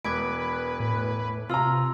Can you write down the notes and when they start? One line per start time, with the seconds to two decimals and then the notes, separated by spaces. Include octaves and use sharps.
0.05 E1 B4 D6 G#6 D7
0.80 A2
1.50 C3 F4 A#5 C6 E6